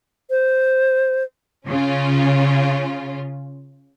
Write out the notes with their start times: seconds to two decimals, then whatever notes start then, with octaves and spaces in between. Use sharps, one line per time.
0.30 C5
1.67 C#3 C#4 F4